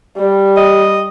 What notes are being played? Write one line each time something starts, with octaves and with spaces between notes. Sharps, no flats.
G3
D#5